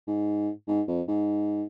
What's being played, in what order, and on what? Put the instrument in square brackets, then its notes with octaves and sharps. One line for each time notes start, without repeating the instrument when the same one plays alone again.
[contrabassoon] G#2
G#2
F2
G#2